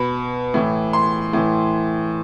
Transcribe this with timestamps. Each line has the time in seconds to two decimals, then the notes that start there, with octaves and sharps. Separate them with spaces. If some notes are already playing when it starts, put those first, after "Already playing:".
Already playing: B2 B5
0.54 A2 E3
0.93 C6
1.33 A2 E3